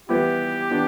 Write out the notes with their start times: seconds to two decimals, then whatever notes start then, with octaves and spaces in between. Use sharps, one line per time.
0.09 E3 G3 B3 E4 G4
0.70 E3 B3 D4